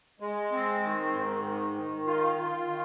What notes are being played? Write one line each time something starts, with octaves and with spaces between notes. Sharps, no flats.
G#3
C4
D#3
G#2
D#3
D#3
F4
F4
D#3